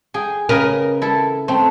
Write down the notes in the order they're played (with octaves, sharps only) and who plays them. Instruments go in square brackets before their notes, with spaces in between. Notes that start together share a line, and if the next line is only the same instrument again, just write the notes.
[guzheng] G#4 G5
[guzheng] C#3 B4 D#5 [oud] A#4
[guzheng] E4 A4
A3 C4